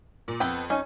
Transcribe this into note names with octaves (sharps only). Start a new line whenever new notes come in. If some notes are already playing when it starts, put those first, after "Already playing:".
A#2
F2 B3 A4 G5
C#4 D#4 G#5